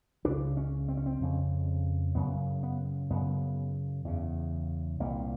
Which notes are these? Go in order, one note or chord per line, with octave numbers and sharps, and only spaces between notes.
C#2 C#3 D4
C#4
C4
C#4
C4
F2 C#3
F#2 C#3 B3
B3
F#2 C#3 B3
E2 C#3
C2 A#2 A#3